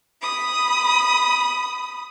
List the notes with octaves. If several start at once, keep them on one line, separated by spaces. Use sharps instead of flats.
B5 D#6